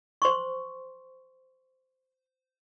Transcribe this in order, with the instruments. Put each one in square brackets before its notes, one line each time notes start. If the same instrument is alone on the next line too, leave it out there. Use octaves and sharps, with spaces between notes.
[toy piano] C5 C6 C#6